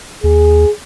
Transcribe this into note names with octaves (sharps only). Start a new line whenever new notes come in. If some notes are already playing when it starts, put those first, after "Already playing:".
D#2 G#4